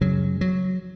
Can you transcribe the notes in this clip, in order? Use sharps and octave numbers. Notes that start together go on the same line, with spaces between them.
F#2 C#3 F#3
F#3